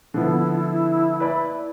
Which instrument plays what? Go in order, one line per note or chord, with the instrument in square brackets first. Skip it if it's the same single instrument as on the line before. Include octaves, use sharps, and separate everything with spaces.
[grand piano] D3 F3 B3 [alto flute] E4
[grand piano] B4 D5 B5